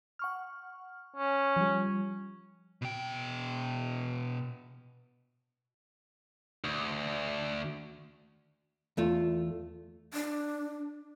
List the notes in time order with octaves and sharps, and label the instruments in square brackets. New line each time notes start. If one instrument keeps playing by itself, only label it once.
[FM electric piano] F#5 C#6 F6
[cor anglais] C#4
[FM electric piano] F3 G3
[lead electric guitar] B2 G5
[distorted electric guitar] D2
[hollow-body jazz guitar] E2 A3 F4
[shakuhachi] D4